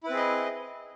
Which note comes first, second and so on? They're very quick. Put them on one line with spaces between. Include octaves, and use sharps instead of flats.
E4 B4 C4 G#4 D#5